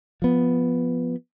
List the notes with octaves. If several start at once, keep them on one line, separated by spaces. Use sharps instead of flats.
F3 B3